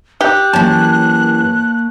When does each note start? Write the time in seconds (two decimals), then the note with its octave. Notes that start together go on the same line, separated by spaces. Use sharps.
0.21 G4 F#6
0.53 F#2 E3 A#3 C#5 A5